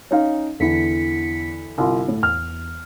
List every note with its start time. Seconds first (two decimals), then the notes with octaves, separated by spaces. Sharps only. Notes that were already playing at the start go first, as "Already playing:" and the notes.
0.11 C#4 D#4 F5
0.60 E2 D3 E3 B6 C#7
1.78 G1 C2 F4
2.08 A2
2.23 E2 F6